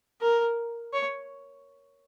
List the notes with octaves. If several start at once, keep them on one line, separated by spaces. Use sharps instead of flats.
A#4
C#5